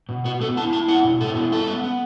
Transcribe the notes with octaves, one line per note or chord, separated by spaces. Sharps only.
B2
B3 F#4
B3 A4
E4 A5
E4 A5
B3 F#5
B2
E4 A4
B3
B3 A4
B3
B3